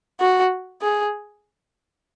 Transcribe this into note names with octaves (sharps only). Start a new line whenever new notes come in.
F#4
G#4